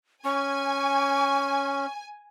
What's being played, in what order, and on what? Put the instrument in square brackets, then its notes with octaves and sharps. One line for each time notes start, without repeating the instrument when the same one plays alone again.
[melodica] C#4 [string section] G#5 [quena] C#6